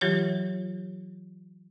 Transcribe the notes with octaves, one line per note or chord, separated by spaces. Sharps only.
E3 F#3 F4 G4 C#5